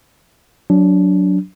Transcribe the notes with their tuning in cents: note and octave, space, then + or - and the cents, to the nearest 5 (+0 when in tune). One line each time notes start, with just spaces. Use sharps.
F#3 +0 D4 -20